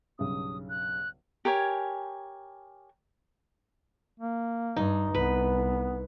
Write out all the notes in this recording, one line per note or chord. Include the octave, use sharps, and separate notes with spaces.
B1 G2 C#3 D#6
F#6
G4 A#4 C#5 G#5
A#3
G2 D#4
C2 B3 B4